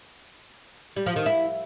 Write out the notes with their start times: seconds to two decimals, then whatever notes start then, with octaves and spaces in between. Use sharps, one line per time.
0.96 G3
1.06 F3
1.16 D#3
1.26 E4